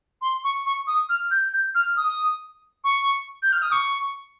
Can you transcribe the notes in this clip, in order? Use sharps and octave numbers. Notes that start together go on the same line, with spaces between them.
C6
C#6
C#6
D#6
F6
G6
G6
F6
D#6
C#6
G6
F6
D#6
C#6